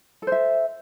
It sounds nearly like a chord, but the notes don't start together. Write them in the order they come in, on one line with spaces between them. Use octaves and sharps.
A4 C5 E5